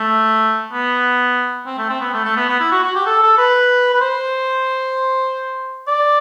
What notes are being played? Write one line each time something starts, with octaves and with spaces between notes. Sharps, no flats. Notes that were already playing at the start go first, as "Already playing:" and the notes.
Already playing: A3
B3
C4
A3
C4
B3
A3
A3
B3
B3
E4
F#4
F#4
G4
A4
A4
B4
B4
C5
D5